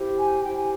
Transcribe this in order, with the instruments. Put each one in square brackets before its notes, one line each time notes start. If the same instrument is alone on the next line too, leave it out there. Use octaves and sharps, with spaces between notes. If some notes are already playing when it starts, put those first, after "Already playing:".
Already playing: [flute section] E4 G4 C5
G#5
E4 G4 C5 G5
G#5